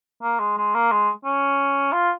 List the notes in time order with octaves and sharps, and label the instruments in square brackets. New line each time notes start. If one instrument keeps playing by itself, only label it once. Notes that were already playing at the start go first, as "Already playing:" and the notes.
[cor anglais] A#3
G#3
G#3
A#3
G#3
C#4
F4